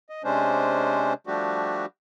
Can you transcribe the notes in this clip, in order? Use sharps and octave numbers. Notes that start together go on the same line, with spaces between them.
D#5
C3 G#3 C#4 D4 C5
F3 G3 A3 D4 F#4 G4